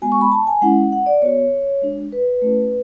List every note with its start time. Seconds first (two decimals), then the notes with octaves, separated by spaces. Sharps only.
0.02 G#3 B3 F#4 G#5
0.12 C#6
0.21 B5
0.32 A5
0.47 G#5
0.62 G#3 C#4 E4 F#5
0.92 F#5
1.06 D5
1.22 B3 F#4 C#5
1.82 G#3 D4 F#4
2.12 B4
2.42 A3 C#4 E4